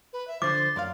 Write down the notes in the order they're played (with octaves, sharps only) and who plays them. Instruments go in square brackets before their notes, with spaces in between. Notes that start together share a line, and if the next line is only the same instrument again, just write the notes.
[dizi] B4
E5
[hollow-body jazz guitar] D3 F3 [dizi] C5 [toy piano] D6 [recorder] A6
[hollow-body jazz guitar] F#2 D5 F5 [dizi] C6